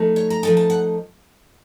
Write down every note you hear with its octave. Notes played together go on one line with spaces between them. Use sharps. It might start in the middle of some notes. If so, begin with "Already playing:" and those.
Already playing: F3 A3 D#4
C#5
A#5
F3 A3 D#4 A5
A5
F#5